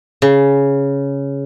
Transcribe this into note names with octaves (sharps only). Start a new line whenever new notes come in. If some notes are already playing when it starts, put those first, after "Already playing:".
C#3